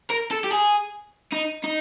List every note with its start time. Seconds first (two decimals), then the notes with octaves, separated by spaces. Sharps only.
0.10 A#4
0.31 A4
0.44 G4
0.51 G#4
1.33 D#4
1.64 D#4